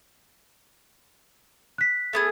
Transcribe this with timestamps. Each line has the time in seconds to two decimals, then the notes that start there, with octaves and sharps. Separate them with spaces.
1.78 F#6 B6
2.13 A3 B3 G#4